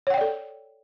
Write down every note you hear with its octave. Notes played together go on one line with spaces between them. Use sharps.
A4 C#5 D5 F#5 G5